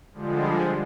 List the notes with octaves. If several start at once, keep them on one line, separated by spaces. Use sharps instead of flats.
D3 F3 G3 G#3